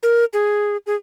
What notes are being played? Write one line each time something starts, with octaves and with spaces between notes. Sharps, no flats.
A#4
G#4
G#4